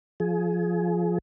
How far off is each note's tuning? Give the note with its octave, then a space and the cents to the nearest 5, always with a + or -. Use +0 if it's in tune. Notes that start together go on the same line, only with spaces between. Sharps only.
F3 +0 G#4 +25